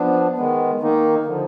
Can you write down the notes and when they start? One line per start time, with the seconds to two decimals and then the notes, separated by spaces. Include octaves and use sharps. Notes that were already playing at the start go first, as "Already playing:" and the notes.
Already playing: F3 B3 D4
0.37 D#3 G#3 B3
0.81 D#3 A#3 D#4
1.26 D3 F3